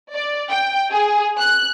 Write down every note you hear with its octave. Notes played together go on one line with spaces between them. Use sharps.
D5
G5
G#4
F#6